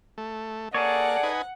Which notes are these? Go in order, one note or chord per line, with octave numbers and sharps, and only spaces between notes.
A3
A#3 G#4 A4 C#5 D5 F#5
D#4 B4 G#5